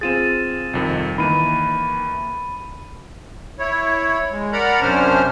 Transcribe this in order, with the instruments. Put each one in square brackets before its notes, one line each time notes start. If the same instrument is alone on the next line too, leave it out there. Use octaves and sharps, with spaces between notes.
[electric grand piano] C4 F4 G#4 [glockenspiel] A6 D#7 E7
[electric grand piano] C2 F2 D#3
[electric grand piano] D#3 E3 A#3 [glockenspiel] B5 D#7
[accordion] E4 C#5
G#3
A#4 D5 F#5 A#5 B5
F#2 C3 C#4 D4 C5 F6